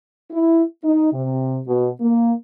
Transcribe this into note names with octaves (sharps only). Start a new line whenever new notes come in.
E4
D#4
C3
B2
A#3